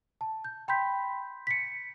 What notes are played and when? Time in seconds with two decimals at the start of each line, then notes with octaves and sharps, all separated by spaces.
0.21 A5
0.44 G6
0.68 G5 B5 C6 G6 B6
1.47 B6 C#7